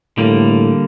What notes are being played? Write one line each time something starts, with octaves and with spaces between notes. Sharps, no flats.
A2 D3 G3 A#3